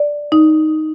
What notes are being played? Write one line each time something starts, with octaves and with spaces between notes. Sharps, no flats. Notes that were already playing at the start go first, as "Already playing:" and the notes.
Already playing: D5
D#4